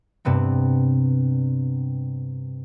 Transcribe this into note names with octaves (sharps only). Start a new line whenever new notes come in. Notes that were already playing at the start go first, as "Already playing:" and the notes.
G2 C3 B3 C4